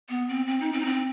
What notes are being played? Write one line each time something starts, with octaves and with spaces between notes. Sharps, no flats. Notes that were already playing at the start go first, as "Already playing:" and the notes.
B3
C4
C4
D#4
C4
D#4
C4